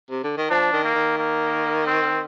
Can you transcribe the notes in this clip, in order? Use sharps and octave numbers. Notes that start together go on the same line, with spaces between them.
C3
D3
D#3
F3 D4
D#3
A#3
D#3
A#3
C4